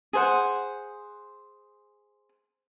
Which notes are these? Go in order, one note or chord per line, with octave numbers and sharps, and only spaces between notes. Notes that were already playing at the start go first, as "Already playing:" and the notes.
G#4 C5 F#5